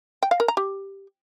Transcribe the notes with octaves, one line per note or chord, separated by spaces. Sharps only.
G5
F5
A#4
A#5
G4